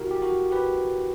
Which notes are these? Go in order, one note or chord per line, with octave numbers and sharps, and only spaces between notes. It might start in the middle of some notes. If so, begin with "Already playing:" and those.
Already playing: E4 F#4 G4 A#4
G4
F#4 A#4
G4 B4